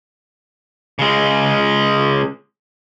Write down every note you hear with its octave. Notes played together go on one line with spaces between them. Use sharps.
C#3 G#3